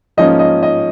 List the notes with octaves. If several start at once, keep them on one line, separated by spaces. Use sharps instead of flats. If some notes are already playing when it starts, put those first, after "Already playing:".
G#2 F3 A#3 C#4 D#5
D#5
D#5